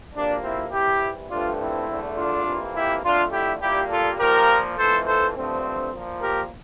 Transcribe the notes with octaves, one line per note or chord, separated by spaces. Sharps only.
D2 C3 F3 A#3 D4
C4 E4
C2 C3 E3 E4 G4
G2 D3 F3 A3 D4 F4
C4 E4
E2 D3 A3
D4 F4
F2 C3 E3 A#3
E4 G4
F2 D3 A3 D4 F4
E4 G4
A#2 G3 A#3 E4 G4
F4 A4
A#2 F3 A#3 G4 A#4
F2 E3 A3 A4 C5
A4 C5
G2 D3 F3 A3 C4
A#2 F3 A#3
G4 A#4